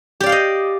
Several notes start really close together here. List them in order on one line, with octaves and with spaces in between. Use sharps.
G4 D5 F5 G5 D#5